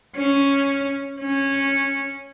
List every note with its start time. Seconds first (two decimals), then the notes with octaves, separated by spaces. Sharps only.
0.16 C#4
1.20 C#4